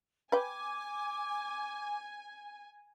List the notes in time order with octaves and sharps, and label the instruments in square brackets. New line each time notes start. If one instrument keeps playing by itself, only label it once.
[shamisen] B4 G5 [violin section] G#5 [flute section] D6